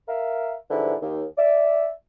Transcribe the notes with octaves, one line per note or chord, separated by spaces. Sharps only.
A#4 E5 F5
G#2 D3 E3 F3 G3 E4
D#2
D5 E5